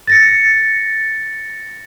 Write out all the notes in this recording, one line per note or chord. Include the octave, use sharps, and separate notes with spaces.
A6 A#6 C#7